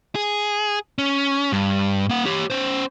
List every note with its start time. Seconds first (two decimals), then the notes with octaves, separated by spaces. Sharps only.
0.15 G#4
0.98 C#4
1.52 G2
2.09 A#3 F#5
2.26 G4 C#5
2.50 C#4 C5